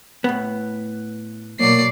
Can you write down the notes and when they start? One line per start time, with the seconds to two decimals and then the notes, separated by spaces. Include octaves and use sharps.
0.24 A2 B3
1.60 B2 F#3 A#3 D5 C7